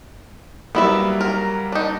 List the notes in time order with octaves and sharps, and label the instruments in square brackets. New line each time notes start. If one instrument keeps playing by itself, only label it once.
[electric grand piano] F#3 G3 A#3 [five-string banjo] B3 E4 E5
[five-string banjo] A#4
D4 D#4